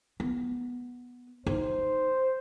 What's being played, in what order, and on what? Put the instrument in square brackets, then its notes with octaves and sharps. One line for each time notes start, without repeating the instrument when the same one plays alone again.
[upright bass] B3
[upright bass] D#4 [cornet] C5